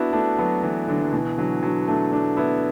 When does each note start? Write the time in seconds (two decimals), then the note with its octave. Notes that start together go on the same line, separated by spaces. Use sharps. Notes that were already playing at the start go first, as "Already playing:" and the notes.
Already playing: B3 D4 E4 F#4
0.13 A3 D4
0.39 F#3 B3
0.63 E3 A3
0.88 D3 F#3
1.02 F#3
1.12 B2 E3
1.38 D3 F#3
1.63 D3 F#3
1.88 A3 D4
2.12 A3 D4
2.37 B3 E4